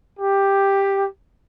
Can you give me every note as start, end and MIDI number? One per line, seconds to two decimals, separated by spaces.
0.20 1.06 67